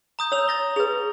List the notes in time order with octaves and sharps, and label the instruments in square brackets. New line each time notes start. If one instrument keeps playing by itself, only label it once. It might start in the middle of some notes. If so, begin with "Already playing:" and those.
[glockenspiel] A#5 D#6 G6
[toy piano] C#5 [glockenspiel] E6 F7
[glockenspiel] A6 A#6 G7
[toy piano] G#4 B4 [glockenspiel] F7